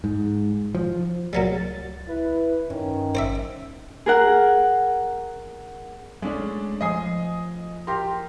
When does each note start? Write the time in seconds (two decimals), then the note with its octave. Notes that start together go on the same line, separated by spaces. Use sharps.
0.04 G#2
0.75 F3
1.33 C#2 A#2 F#3 G3 A6
2.08 E4 B4
2.70 G2 D#3 C#4
3.15 G#1 C5 D5 E5
4.06 G#4 A#4 F#5
6.22 G#3 A3 C#4 D4
6.81 F3 D#5 G#5 D#6 C7
7.87 G4 A#4 C6